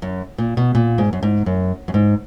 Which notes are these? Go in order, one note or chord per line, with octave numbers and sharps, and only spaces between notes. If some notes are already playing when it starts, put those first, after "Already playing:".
F#2
A#2
B2
A#2
G#2
F#2
G#2
F#2
F#2
G#2